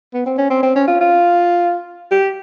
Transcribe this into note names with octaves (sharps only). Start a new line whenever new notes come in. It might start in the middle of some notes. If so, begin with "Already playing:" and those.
B3
C4
C#4
C4
C4
C#4
F4
F4
G4